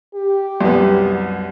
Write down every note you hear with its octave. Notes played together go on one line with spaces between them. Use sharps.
G4
C2 F#2 B3